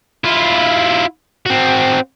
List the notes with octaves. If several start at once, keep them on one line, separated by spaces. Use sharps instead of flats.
E4 F4
C4 F#4